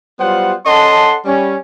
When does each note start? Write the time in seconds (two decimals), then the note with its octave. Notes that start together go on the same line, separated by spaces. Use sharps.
0.20 F#3 G3 B3 F4 C5 F#5
0.67 C#4 A4 D#5 F#5 A5 C6
1.25 G3 C#4